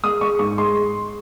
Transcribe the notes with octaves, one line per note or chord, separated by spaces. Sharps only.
G#3 D#6
G#3 C#6
G#2 C#6
G#3 C6